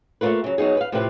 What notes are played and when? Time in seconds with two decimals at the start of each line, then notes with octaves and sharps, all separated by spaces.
0.21 A3 A#3 C#4 F4 A#4 B4
0.44 C#3 F#3
0.58 F#3 B3 D#4 G#4
0.77 B4 F5
0.92 A2 C3 F3 C4 E4 B4